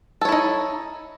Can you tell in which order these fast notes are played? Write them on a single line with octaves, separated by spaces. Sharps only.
A4 C#5 E4 D#4